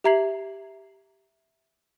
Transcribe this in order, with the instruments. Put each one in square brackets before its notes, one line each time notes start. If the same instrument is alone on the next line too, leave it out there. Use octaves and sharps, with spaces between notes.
[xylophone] G4 E5 A#5 G#6 C7 F#7